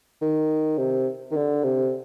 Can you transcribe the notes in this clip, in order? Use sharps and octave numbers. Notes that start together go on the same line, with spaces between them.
D#3
C3
D#3
D3
C3